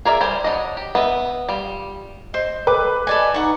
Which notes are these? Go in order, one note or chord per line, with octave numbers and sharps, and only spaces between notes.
G#4 A#4 C#5 D5 E5
G3 C5 G#5
F#3 A#3 D4 D#5
G4
B3 D#5 E5
G3 F4
C5 D#5
A4 B4 D6
A4 D5 D#5 G#5
D#4 F#5 C#6